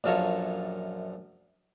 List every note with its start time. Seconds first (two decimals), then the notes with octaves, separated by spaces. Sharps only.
0.04 A#1 F#2 F4 A4 C#5 A#5